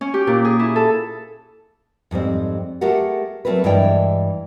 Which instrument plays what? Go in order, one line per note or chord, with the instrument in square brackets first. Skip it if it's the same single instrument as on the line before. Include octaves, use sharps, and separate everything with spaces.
[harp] C#4
G4
A#2
G#4
E4
A4
[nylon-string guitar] F2 G#2 G3 C4
A3 G4 G#4 A#4 F#5
F#3 G3 A3 C4 A#4 B4
G2 E3 G#3 D5 E5 G5